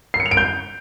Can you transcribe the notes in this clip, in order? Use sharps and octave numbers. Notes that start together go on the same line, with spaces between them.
C7
C#7
F7
D7
G6